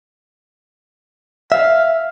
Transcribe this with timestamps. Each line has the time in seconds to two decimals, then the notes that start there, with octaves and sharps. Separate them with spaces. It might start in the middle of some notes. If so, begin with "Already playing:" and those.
1.52 E5 F5